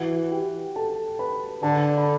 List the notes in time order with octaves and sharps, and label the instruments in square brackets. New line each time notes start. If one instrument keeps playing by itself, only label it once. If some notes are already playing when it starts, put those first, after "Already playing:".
Already playing: [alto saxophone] E3 [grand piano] F#4 F#5
[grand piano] G4 G5
A4 A5
B4 B5
[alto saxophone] D3 [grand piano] A4 A5
[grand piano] B5